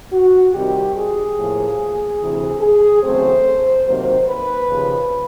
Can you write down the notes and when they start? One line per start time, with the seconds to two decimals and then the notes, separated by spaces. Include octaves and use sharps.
0.13 F#4
0.54 C3 D#3 G3 C4 G4
0.97 G#4
1.37 A2 F3 A#3
2.20 D2 C3 E3
2.61 G#4
3.03 E2 C#3 F#3 A3 C4 C5
3.86 C3 D#3 F#3 A#3 C5
4.28 B4
4.69 D#2 C#3 F3